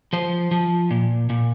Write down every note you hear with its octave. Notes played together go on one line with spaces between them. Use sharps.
F3 C5
F3
A#2
A#2